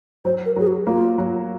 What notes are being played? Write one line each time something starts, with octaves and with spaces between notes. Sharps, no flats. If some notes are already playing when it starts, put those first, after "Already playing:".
F#3 C5
A#4
F#3 G#4
F#4
A#3 F4
F#3